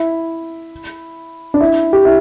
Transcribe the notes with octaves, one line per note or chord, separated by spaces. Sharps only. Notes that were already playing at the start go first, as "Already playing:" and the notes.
Already playing: E4
D4
E4
G4
E4